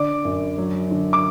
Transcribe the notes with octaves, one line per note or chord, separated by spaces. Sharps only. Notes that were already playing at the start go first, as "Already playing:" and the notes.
Already playing: D3 D5 D6
F#2
F#3
D3
D6